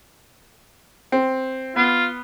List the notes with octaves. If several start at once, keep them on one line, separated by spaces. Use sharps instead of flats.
C4
B3 F4